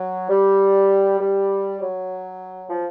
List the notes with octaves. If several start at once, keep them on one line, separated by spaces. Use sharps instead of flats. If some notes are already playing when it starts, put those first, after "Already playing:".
Already playing: F#3
G3
G3
F#3
F3